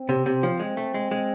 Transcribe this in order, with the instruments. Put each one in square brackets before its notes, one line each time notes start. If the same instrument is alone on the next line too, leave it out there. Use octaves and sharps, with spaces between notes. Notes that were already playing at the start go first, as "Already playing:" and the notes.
Already playing: [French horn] C4
[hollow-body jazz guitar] C3
C3
F3
[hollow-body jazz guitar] G#3 [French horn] C4
[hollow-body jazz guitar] A3
G#3
G#3